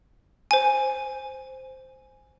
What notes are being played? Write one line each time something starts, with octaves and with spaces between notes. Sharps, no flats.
C5 G#5